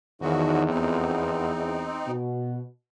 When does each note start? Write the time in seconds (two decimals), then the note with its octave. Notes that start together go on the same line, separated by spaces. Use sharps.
0.21 E2 D#3 F3 F#3 D#4 F#4
0.69 F2 B3 C4 D#4
2.07 B2